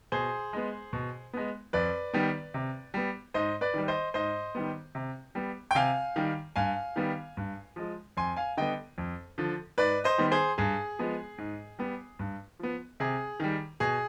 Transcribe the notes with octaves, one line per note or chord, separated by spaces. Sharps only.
B2 G#4 C5
G#3 B3
B2
G#3 B3
F2 B4 D5
D#3 G3 B3
C3
G3 B3
G#2 C5 D#5
B4 D5
D#3 G3
C5 D#5
G#2 C5 D#5
D#3 G3 B3
C3
G3 B3
G5
C3 F5 G#5
D#3 G3
G2 F5 G#5
D#3 G3 B3
G2
F3 G#3
F2 G#5 C6
F5 G#5
D3 G3 B3 D#5 G5
F2
D3 F3
G#2 B4 D5
C5 D#5
D#3 G3 B3
G#4 C5
G2 G#4
F3 G#3 B3
G#2
G3 B3
G2
F3 B3
C3 G#4
D#3 G3
B2 G#4